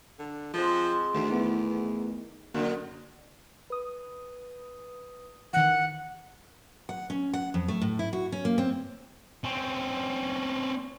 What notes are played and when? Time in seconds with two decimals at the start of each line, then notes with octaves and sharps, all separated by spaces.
0.19 D3
0.54 F3 G#3 C4
1.15 D2 D#3 A3
1.30 E2 A3 B3 E4
2.54 F#2 D3 A#3
3.70 B4 D#6
5.53 D#3 E3 F#5
6.89 F#5
7.10 C#4
7.33 F#5
7.54 F2
7.68 A3
7.81 A2
7.99 E4
8.13 F#4
8.32 C#4
8.45 A#3
8.58 C4
9.44 C4 C#4